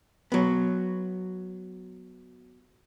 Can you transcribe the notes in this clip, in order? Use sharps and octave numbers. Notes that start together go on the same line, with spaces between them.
F#3 B3